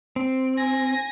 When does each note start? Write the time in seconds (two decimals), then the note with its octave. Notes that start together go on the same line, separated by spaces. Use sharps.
0.16 C4
0.57 G#5 A#6